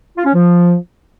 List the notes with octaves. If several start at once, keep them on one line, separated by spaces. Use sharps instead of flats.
F4
C#4
F3